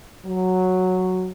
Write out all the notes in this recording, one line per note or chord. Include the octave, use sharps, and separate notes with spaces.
F#3